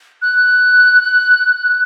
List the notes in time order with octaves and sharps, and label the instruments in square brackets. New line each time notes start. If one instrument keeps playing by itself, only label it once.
[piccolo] F#6